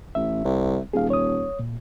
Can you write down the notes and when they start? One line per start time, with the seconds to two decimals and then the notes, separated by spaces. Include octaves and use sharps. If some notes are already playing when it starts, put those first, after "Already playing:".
0.15 A1 E5
0.44 C2
0.93 D#1 G#4 F5
1.10 C#5 D#6
1.59 A#2